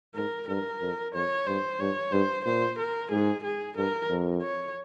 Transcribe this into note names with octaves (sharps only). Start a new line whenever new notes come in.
G#2 A#4
G2 A#4
F2
F2 C#5
G2 C5
G2 C#5
G2 C5
A#2 C5
A#4
G#2 G#4
G#4
G2 A#4
F2
C#5